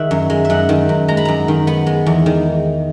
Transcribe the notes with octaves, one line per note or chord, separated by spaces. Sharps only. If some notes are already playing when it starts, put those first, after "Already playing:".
Already playing: D#3 G#4 E5 F#5
F#2
G#3
E5
F#2 F#5
D#3
F#2
G#3 A#5
B5
F#2 A#5
D#3
B3 B5
G#3
E2
D#3